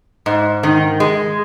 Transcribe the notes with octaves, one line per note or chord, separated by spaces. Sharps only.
G#2
D#3
G#3